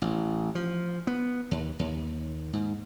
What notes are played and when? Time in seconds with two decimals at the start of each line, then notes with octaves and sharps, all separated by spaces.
0.02 A1
0.55 F3
1.07 B3
1.51 D#2
1.79 D#2
2.53 G#2